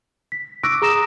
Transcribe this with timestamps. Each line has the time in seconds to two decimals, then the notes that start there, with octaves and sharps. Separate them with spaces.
0.32 B6
0.64 C#6 D6 E6 F#6 A#6 D7
0.82 G#4 A#5 D#6 A#6 E7